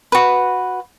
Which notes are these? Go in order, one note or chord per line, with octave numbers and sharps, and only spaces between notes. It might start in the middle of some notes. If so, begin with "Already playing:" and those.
F#4 B4